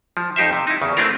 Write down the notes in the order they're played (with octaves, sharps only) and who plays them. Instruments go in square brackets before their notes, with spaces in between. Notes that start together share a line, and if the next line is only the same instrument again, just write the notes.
[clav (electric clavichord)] F3
F2 D#4 G4 C5 E5
C3
D#4 E4
E2 C#3
A3 C4 D4 E4 F4 A#4